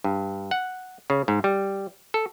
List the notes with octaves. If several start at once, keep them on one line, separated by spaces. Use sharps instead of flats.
G2
F#5
C#3
G#2
G3
A4